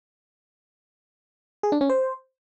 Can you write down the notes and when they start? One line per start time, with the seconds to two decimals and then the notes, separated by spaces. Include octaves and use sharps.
1.63 G#4
1.72 D4
1.81 C#4
1.89 C5